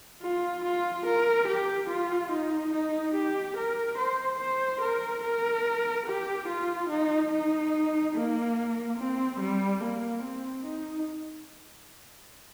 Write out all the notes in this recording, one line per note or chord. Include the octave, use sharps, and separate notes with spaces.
F4
F4
A#4
G4
F4
D#4
D#4
G4
A#4
C5
C5
A#4
A#4
G4
F4
D#4
D#4
A#3
C4
G3
A#3
C4
D#4